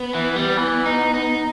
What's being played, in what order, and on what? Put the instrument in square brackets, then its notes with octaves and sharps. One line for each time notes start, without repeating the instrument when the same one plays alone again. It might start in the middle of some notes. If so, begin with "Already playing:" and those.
Already playing: [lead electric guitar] B3
[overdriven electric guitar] E3
G3
E3
D#4
D#4